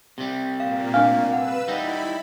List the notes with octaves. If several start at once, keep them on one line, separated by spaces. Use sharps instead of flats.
C3 G3
A#2 A#3 F5
A3 D4 F5 G#5
B4 F#5 E6
G3 D#4 E4 B5